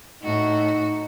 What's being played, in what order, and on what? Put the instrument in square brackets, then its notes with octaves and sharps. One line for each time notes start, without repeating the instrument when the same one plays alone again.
[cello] A2 F#4 [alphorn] D#4